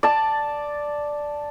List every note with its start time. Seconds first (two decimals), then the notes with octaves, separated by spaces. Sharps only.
0.03 D5 A5